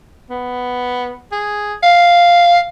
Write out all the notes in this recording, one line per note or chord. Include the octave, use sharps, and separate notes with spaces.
B3
G#4
F5